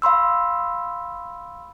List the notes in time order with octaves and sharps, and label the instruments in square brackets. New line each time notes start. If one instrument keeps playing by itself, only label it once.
[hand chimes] F5 B5 C6 E6